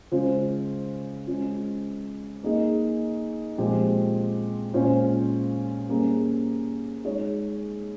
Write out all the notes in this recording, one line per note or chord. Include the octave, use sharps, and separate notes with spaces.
C#3 G#3 C#4 F4 C5
G#3 C#4 F4
A#3 D#4 G#4 D#5
A#2 F3 G#3 C4 G4
A#2 G#3 C#4 F4 C5
G3 A#3 C#4 G#4
G#3 D#4 G#4 C#5